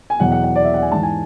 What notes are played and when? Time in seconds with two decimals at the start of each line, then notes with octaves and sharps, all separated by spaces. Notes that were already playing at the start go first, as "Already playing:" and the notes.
0.10 G#5
0.20 E2 B2 F#3 F#5
0.32 F#5
0.44 F#5
0.56 D5
0.65 E5
0.74 F#5
0.82 G#5
0.92 G#2 E3 A5
1.03 G#5